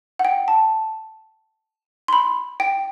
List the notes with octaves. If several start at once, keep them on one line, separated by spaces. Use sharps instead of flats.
F#5
G5
A5
C6
B5
G5